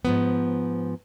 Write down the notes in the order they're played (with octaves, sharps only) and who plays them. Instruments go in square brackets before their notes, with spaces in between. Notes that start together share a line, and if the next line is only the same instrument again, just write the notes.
[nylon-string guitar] G#2 F3 B3